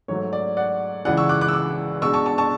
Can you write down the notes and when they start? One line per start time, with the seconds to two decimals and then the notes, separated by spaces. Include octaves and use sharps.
0.08 G#2 F#3 A3 C#5
0.33 D5
0.57 D5 F#5
1.05 C#2 C#3 E3 D5 F#5
1.17 C#6 E6
1.29 D6 F#6
1.41 D6 F#6
1.48 E6
1.53 D6 F#6
2.02 B2 G#3 D4 C#6 E6
2.14 A5 C#6
2.26 A5 C#6
2.38 A5 C#6